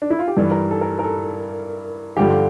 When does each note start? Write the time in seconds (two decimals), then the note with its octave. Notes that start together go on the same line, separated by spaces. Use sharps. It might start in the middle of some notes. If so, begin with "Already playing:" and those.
0.02 D4
0.10 E4
0.19 F4
0.28 G4
0.36 G2 E3 G3 A4
0.51 A#4
0.71 A4
0.81 A#4
0.99 A#4
1.04 A4
2.17 G2 D3 F3 G4
2.29 F4